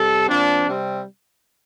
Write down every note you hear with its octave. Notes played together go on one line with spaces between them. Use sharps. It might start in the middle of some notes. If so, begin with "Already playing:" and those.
Already playing: C3 G3 A4
A#2 F3 C4 D4
C3 G3 C4